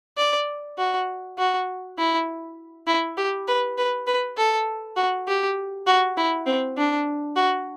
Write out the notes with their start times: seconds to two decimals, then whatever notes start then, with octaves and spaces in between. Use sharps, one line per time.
0.17 D5
0.78 F#4
1.38 F#4
1.98 E4
2.87 E4
3.17 G4
3.48 B4
3.78 B4
4.07 B4
4.37 A4
4.97 F#4
5.28 G4
5.87 F#4
6.17 E4
6.47 C4
6.77 D4
7.36 F#4